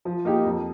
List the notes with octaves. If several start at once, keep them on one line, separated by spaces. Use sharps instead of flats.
F3
A#3 D#4 G4
F2